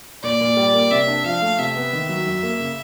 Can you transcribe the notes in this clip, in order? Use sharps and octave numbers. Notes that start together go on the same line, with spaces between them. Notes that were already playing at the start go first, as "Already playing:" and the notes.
A#2 D5
A#2
G3
A#3
C3 E5
D4
F3 F5
A3
C3 E5
B3
D#3
F#3
F#2
A#3
C#3